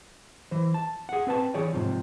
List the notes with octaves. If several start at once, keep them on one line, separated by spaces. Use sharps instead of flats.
E3 C5
A5
G#4 F#5
C4 B4 A5
E3 G#4 C#5 D5
G#2 C3 F3